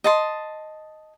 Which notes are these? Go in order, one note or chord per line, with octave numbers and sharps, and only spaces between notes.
D#5 A5 C6